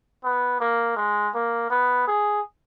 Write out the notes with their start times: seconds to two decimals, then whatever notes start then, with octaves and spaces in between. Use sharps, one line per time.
0.24 B3
0.60 A#3
0.97 G#3
1.35 A#3
1.70 B3
2.08 G#4